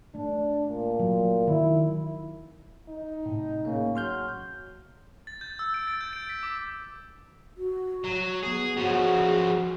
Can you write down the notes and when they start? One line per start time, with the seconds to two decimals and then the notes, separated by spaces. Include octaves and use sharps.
0.15 A3 D4
0.67 A#2
1.00 F#3
1.47 D#3 E4
2.89 D#4
3.26 A2 C3
3.65 C#3 A3 A#3
3.96 F#3 C6 F6 G6
5.27 A6
5.41 G6
5.59 E6
5.74 D7
5.87 A6
6.01 G6
6.13 D7
6.29 B6
6.43 D6
7.57 F#4
8.04 F#3
8.43 B3 G#4
8.77 F3 C#4 F#4 G#4